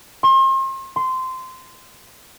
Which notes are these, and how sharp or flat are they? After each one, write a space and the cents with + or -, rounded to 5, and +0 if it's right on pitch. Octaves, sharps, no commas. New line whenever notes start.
C6 +40
C6 -15